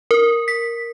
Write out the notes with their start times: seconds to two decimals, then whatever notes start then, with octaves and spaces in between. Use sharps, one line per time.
0.11 A#4
0.48 B6